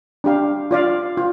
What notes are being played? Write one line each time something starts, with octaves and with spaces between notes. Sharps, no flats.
D4 G4 F5
F4 D5 F5
F4